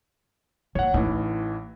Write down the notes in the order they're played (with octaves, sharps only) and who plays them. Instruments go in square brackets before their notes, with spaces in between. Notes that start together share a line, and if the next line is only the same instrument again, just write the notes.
[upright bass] E3 A#3 [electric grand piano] C#5 F#5
[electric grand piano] A1 E3 [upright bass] A3 D#4